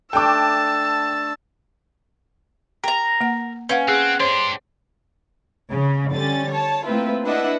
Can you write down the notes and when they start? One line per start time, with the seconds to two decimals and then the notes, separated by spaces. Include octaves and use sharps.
0.13 A3 D4 G5 A5 C#6 D6 E6
2.84 A#4 G5 A#5
3.21 A#3 F#5
3.69 C#4 B4 F5 F#5
3.88 C4 G#4 F#5
4.20 D4 G4 C5 C#5 C6
5.70 C#3
6.13 D3 G3 C#4 A6
6.49 C#5 A5
6.85 A3 A#3 C4 E4 F4 B4
7.25 D4 E4 B4 D#5 E5 F#5